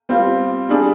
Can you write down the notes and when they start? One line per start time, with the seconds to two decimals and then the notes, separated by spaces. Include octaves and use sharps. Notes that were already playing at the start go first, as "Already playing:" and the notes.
0.09 G3 C4 F4
0.69 G3 D4 G#4